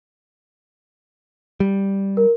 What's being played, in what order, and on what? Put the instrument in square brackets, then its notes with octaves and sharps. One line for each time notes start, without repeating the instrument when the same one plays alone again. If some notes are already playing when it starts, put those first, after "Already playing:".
[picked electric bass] G3
[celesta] A#4